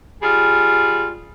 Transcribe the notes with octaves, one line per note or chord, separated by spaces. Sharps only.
G3 F4 G#4